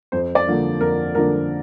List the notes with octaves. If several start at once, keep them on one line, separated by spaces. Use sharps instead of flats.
F2 C5
D5
D3 F3 A#3 D4
F2 A#4
D3 F3 A#3 D4 A#4